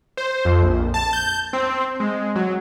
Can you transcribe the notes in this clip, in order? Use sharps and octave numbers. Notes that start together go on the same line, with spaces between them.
C5
F2
A#1
A5
G6
C4
G#3
F#3